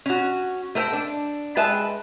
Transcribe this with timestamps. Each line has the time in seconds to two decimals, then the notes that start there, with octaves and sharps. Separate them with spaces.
0.06 C#4 F#4
0.75 A3 A#4 C5 G5
0.93 D4
1.57 G#3 B4 E5 G5 A5